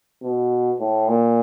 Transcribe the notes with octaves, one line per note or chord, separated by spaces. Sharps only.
B2
A2
A#2